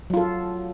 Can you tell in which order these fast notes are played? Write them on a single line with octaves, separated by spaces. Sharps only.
F#3 F4 A4